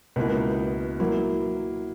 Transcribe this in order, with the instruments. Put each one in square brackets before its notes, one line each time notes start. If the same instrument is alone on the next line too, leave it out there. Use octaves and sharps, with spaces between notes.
[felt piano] C#2 B2 A#3 E4
F#3 A#3 E4